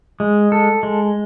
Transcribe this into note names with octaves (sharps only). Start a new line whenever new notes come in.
G#3
A4
G#3